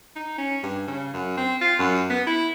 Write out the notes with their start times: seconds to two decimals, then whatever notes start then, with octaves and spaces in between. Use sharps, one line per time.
0.16 D#4
0.38 C#4
0.63 G2
0.88 C#3
1.14 F#2
1.38 C4
1.61 F4
1.79 F#2
2.10 B3
2.27 E4